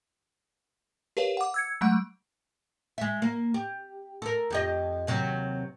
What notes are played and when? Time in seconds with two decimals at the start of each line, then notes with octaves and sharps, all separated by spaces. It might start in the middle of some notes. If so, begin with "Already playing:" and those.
1.17 G4 A#4 B4 C#5 F5
1.37 F#5 D6
1.54 E6 G#6 C#7
1.81 F#3 G#3 A3 F#5 D7
2.98 G#3 E5
3.22 A#3
3.54 G4
4.22 A4 A#4
4.50 F2 G4 D#5
5.07 D#2 C3 F#3